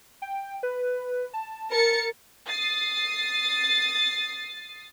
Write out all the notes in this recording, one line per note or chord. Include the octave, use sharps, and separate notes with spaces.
G5
B4
A5
A#4 A6 C#7
D#6 A6 C7